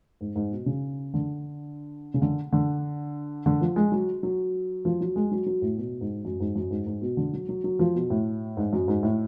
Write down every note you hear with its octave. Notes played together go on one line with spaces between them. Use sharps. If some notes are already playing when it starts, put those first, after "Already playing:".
G#2
G#2
B2
C#3
D3
C#3
D3
D3
D3
F3
G#3
F#3
F#3
F3
F#3
G#3
F#3
F#3
A2
B2
G#2
F#2
G#2
F#2
G#2
G#2
B2
D3
F#3
F#3
F#3
F3
B2
A2
G#2
F#2
G#2
A2